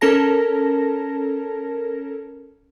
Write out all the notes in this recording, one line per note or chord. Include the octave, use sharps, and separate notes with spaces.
C#4 A4 A#4 A5 A#6